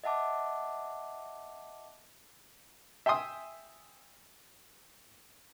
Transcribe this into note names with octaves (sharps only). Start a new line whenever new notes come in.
D#5 E5 F#5 A5 D6
E5 G5 G#5 C6 D#6